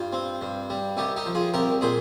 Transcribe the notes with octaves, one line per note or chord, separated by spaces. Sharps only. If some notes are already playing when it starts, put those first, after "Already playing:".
Already playing: G2 F4
C4
G2
G3
C2 D#4 G4
D#4 G4
F3
F4 G#4
C2 G4 A#4
A#2 G#4 C5